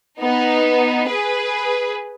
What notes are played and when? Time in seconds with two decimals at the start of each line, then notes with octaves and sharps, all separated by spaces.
0.21 B3 D#4
1.09 G#4 B4